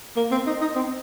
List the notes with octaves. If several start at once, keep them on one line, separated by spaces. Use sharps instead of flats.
A#3
C4
D#4
D#4
C4